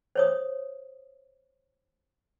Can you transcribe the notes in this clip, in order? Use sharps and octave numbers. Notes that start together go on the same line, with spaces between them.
C5 C#5 D#6